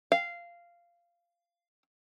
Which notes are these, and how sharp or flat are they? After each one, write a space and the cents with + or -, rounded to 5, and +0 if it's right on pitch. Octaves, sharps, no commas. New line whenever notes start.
F5 -10